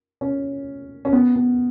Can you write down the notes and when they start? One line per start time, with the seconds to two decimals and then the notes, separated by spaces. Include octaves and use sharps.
0.21 C#4
1.05 C#4
1.12 B3
1.36 B3